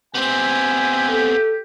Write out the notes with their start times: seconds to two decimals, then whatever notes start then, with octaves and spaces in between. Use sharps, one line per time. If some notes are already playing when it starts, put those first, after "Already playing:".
0.15 B3 C4 G4 E5 G#5
1.10 A4